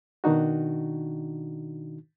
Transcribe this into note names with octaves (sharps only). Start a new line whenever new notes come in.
B2 D#3 D4 D#4 F#4